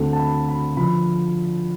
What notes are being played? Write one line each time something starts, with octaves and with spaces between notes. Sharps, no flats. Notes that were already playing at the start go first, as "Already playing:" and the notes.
Already playing: D2 D3 A3 C4
A5
B5
B5
D3 F3 B5